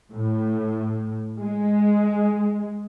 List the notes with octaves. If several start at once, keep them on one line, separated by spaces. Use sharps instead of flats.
A2
G#3